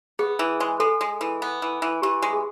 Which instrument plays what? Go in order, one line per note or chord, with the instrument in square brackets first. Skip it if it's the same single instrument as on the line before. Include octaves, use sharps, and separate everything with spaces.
[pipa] B3 [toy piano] G#4
[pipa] E3
G#3
[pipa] G#3 [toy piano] A4
[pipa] G#3
E3
B3
E3
E3
[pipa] E3 [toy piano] G4
[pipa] G#3
[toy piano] G#4